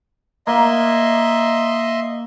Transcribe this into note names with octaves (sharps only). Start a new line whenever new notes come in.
A#3 D#5 E5 C6